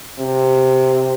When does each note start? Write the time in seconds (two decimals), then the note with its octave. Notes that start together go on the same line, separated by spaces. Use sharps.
0.19 C3